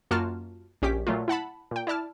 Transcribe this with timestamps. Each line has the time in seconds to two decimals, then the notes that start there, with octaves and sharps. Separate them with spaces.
0.11 F#2 A#3 F4 F#4 A5 F6
0.82 A#1 C#4 G4 D6 B6
1.07 A#2 F#3 A3 F4
1.28 E4 F#5 A5 B5
1.71 A#2 G5
1.87 E4 D5 A5 F6